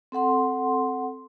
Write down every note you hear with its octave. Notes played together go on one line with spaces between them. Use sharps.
C4 A4 F#5 C6